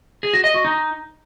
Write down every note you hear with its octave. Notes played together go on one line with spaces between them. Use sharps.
G#4
F#4
D#5
F#4
D#4